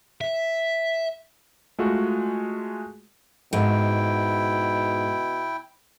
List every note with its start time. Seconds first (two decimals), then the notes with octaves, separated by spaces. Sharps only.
0.21 E5
1.78 G#3 A3 F4 F#4
3.53 G#2 B2 E4 G5